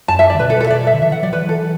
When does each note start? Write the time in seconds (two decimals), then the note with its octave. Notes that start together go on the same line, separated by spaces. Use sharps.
0.08 F#2 A5
0.19 E5
0.30 D5
0.35 D3
0.39 B2 B4
0.50 A4
0.56 B4
0.60 A4
0.67 E5
0.70 D5
0.87 E5
0.94 D3
1.02 E3 E5
1.12 E3 F#5
1.23 F#3 D5
1.33 E3 B4
1.49 A4